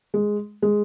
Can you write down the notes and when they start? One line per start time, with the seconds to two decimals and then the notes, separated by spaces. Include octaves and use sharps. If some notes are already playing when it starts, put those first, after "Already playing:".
0.14 G#3
0.62 G#3